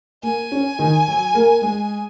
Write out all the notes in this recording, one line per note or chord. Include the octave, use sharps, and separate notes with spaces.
A#3 G#5
C#4
D#3 D#4
F#3 F#4
A#3 A#4
G#3 G#4